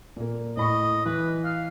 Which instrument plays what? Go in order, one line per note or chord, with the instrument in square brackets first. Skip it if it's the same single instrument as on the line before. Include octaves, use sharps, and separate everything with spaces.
[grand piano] A#2 A#3
[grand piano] A2 B5 C#6 [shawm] D#5
[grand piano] E3 [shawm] B4
[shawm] F5